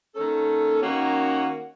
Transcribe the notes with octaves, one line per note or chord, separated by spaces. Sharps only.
D#3 A#3 C#4 A4
D#3 A#3 C#4 F#4